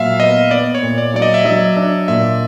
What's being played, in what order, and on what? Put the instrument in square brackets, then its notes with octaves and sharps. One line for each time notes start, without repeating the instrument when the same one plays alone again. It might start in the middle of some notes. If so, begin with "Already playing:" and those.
Already playing: [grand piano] A#2 F#3 [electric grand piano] E5 F5
[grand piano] B3 [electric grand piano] D#5
[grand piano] B3 [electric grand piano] D5
[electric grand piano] C#5
[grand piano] A#2
[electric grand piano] D5
[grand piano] F#3 [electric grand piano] D5
[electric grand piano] D#5
E5
[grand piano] F#3 [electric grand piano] D#5
[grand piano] D4 [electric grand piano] E5
[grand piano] A#2 [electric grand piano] E5